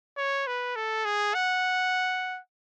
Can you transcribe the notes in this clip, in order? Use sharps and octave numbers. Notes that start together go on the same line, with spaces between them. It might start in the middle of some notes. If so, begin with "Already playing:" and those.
C#5
B4
A4
G#4
F#5